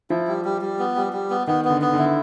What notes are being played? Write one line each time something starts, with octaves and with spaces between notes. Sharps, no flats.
F3 E4
G3
G3
G3
B3
G3
G3
B3
D#3 B3
B3
D3
B3
D3 E4